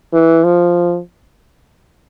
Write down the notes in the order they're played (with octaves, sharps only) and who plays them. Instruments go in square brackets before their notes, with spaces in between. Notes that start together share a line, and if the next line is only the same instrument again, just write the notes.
[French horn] E3
F3